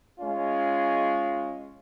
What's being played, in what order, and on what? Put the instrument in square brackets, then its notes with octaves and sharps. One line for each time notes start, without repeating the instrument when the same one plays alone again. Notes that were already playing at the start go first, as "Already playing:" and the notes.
[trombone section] G#3 C#4 F4